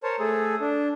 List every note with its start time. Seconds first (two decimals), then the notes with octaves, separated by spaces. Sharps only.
0.03 A#4 C5 C#5 A5
0.19 A3 G#4 A4
0.61 D4